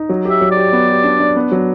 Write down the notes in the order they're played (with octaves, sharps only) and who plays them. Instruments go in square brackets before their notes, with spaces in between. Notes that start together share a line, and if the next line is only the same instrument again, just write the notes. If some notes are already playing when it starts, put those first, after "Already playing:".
Already playing: [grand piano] D#4
F#3
[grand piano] G4 [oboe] E5
[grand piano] F#3
[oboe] D5
[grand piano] G4
B3
G4
D4
D4
B3
F#3